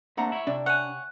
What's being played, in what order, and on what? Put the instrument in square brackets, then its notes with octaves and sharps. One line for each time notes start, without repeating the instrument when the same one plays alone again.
[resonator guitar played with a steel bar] A3 F#5 A#5 [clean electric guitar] A#3 C4 D4
[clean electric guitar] E4 C#5
[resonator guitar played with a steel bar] C3 [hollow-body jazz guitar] D4
[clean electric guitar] C#5 G#5 [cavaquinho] F#5